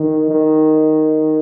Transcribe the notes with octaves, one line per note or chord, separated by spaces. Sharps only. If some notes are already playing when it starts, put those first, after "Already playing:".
Already playing: D#3
D#3